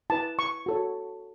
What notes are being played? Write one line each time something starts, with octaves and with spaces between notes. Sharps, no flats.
E4 B4 A5
C#6
F#4 A4 C#5